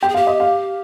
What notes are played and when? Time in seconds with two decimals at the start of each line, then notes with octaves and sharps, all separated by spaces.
0.01 G4 G5
0.08 G#4
0.14 G4 F5
0.27 D#5
0.40 F5